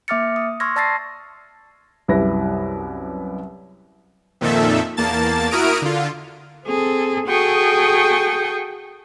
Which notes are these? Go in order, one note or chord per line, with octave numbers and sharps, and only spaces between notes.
A#3 E5 D6 F6 A6 C#7
D#6
C6 C#6 E6 F6 G#6 A#6
D5 A5 E6 A6 A#6 C7
C2 F#2 G3 E4 B4 A#6
F2 A#2 D#3 A4 E5
E2 A#3 A5 A6
E4 F#4 A#4 D#6 F6 D7
D3 F4
C4 G#4 A4
F#4 G#4 A4 G5 C#6 D#6